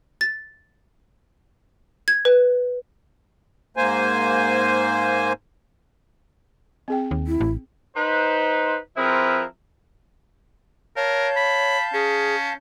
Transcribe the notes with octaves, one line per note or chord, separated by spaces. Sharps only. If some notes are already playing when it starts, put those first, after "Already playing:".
A6
G#6
B4
G#2 A#3 C5 G#5
C4 G#4 G5
D#2
E4
A1
D#4 B4 C5
F3 C4 E4 G#4 A#4 B4
A#4 C#5 F5 A5 G6
B5
C#4 G#4